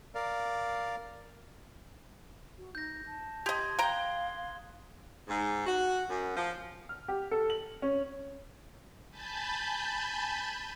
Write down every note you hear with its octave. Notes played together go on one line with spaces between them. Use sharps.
A#4 D5 F5
F#4
D#4 G6 A#6
A5
G4 D#5 C6 D#6 G#6
F5 G5 A#5 F#6 G7
G#2
F#4
F#2
F3
F6
G4
A4
F#7
C#4
G#5 A5 B5 G6 A6